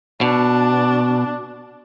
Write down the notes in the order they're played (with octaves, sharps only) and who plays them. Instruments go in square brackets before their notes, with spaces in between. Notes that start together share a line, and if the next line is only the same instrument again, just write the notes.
[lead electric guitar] B2 [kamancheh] D4